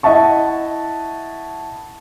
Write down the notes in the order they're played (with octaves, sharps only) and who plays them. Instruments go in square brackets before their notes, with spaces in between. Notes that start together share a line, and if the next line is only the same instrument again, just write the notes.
[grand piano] E4 D#5 E5 F#5 A5 C#6